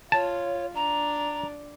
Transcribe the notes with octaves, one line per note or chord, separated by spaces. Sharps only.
F4 C#5 A5
D4 A#5